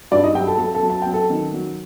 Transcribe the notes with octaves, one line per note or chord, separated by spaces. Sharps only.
G2 D4 D5
D#4 D#5
F#3 G4 G5
A4 A5
F#3 A4 A5
A4 A5
F#3
A5
F#3 G5
A4 A5
D#3
F#3